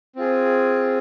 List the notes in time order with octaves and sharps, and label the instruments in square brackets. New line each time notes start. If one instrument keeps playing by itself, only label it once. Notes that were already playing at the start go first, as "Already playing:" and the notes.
[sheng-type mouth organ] C4 F4 G#4